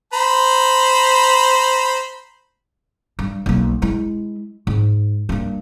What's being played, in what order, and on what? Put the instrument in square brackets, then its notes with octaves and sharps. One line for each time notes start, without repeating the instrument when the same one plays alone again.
[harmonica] C5 A#5 B5
[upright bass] G2
B1 A#3
G#3 E4
G#2
G2 A#3